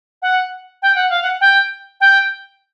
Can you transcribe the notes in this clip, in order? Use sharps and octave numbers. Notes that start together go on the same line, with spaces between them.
F#5
G5
F#5
F5
F#5
G5
G5